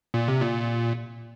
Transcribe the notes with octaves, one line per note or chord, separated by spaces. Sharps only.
A#2
C3
A#2